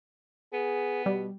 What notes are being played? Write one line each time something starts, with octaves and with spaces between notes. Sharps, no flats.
B3 G#4
B2 G3